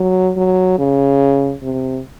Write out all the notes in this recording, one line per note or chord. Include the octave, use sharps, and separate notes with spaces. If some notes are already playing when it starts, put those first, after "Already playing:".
Already playing: F#3
F#3
C#3
C3